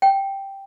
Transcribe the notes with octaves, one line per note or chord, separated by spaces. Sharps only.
G5